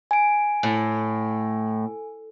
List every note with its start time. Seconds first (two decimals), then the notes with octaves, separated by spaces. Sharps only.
0.11 G#5 D7
0.63 A2